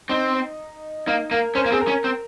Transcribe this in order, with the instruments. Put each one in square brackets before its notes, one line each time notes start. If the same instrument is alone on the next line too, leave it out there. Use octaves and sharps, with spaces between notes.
[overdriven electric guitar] C4 [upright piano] D#4
[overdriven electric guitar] A#3 [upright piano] D#4
[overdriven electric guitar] A#3 [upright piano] A#4
[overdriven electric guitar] C#4 [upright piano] C5
[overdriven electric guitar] A#3 [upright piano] A#4
[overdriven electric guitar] C4 [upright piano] G#4
[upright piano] A#4
[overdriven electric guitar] C#4
C4